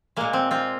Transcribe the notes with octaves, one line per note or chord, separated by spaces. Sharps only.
A#2 G#3 A#3
C4
C4 F4